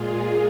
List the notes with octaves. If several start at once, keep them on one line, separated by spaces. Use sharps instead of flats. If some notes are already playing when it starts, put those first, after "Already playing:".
Already playing: A#2 G#3 F4 G#4